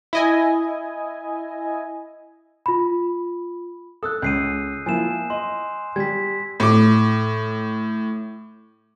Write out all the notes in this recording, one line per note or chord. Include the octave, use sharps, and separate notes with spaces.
E4 D#5 G#5
F4 B5
A4 D#6 E6 F#6
C#2 G6 C7 D#7
F3 A#3 E4 G#5 E7
D#5 C6
G3 G#6 B6
A2 D6